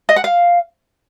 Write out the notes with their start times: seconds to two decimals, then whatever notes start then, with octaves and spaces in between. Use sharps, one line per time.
0.09 D#5
0.16 F#5
0.24 F5